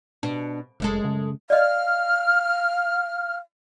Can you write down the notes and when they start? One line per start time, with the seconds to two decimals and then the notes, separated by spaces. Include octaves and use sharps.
0.23 B2 D4
0.80 F1 F#2 G#3 A4
1.05 C#3
1.50 D5 D#5 F5 F6